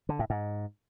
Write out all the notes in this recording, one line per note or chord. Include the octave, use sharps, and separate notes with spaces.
D3
A2
G#2